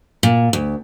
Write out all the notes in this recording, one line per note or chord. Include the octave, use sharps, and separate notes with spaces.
A#2
D2